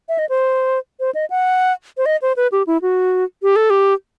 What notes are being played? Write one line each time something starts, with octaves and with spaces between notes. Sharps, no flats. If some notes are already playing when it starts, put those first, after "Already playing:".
E5
D#5
C5
C5
D#5
F#5
C5
D#5
C5
B4
G4
E4
F#4
G4
A4
G4